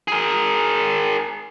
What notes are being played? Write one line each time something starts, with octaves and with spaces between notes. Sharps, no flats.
G#4 A#4